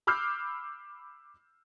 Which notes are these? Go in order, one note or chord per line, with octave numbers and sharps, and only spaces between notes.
B5 D6 E6 F6 G6 C7